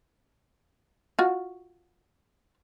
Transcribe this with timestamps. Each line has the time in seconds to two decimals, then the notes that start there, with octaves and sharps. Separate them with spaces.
1.19 F4 F#4